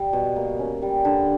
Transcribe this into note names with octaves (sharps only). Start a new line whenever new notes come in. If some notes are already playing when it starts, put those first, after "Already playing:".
Already playing: G3
B2
A#3
C#4
G3
D3